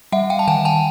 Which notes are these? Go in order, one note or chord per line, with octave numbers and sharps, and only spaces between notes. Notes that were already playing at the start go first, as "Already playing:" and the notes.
G3 E5 F#5
F5 G5
A5
D#3 F#5 G#5
G5 A5